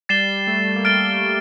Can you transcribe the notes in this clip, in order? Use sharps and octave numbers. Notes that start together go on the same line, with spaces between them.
G3 A6 C7 E7 G7
A3
A#3
A3 F6 A6 D7 G7